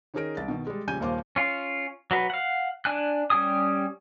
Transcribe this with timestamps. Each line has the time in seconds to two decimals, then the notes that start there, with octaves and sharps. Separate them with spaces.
0.14 D#3 C#4 D#4 G#4 A#4 D7
0.37 C2 A6
0.48 B2 D#3
0.67 G3 G#3
0.87 A#1 C#3 G3 G#5 G6 D#7
1.00 D#1 D#2 A#3 C5 F5 D6
1.36 C#4 F4
2.11 F#3 F#4 B4
2.30 F5 F#5
2.85 D4 G#5 F#6
3.30 G3 C#4 G4 G#5 D#6